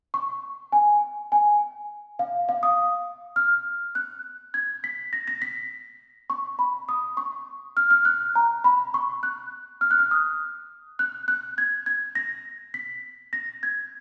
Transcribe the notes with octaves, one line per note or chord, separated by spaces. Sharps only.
C#6
G#5
G#5
F5
F5
D#6
F6
F#6
G#6
B6
A#6
A#6
B6
C#6
B5
D#6
C#6
F6
F6
F#6
A#5
B5
C#6
F#6
F6
F#6
F6
D#6
F#6
F#6
G#6
G#6
A#6
B6
A#6
G#6